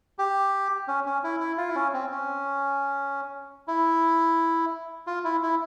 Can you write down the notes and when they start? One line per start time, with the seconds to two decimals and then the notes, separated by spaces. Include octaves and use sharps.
0.19 G4
0.88 C#4
1.06 C#4
1.24 E4
1.40 E4
1.58 F4
1.69 E4
1.75 C#4
1.93 C4
2.11 C#4
3.68 E4
5.07 F4
5.24 E4
5.43 E4